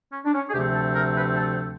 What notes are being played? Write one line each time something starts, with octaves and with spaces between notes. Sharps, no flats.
C#4
D4
C#4
G#4
D2 C3 F3 A3 C4 G4
A4
A#4
B4
A4